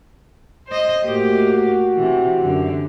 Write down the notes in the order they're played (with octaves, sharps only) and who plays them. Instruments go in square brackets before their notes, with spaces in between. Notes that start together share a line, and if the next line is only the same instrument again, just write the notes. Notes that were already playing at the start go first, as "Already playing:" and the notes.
[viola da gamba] C5 D#5
[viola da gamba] A2 A#3 G4 [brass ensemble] F#4
[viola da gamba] C3 E3
F#2 D3